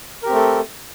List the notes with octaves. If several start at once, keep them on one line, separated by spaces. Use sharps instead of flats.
A3 C4 G4 A4 A#4